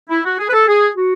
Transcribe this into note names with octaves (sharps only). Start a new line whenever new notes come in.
E4
F#4
G#4
B4
A4
G#4
F#4